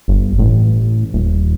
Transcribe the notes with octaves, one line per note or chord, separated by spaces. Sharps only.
G1
A1
D#1